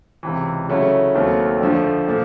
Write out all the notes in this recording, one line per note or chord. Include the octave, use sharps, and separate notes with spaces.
C#2 C3 E3
C#3 F#3 A3 C#4 E4
D#2 D#3 F#3 A3 C4
F2 D3 F3 A3
A#2 F3